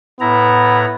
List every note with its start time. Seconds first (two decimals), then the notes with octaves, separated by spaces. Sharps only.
0.20 A2 B3 E4 A#5